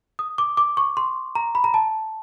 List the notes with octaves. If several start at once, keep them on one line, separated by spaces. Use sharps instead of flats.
D#6
D6
D6
C#6
C6
A#5
B5
A#5
A5